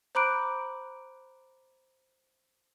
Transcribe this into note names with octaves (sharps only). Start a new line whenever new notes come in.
C5 A#5 B5 D6 F#6 D7